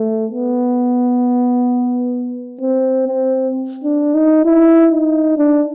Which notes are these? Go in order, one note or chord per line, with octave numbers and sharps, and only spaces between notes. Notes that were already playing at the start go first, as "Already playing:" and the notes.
Already playing: A3
B3
C4
C4
D4
D#4
E4
D#4
D4